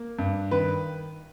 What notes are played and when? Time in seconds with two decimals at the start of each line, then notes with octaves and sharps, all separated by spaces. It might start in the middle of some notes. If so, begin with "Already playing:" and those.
Already playing: A#3
0.19 G2
0.51 D#3 B4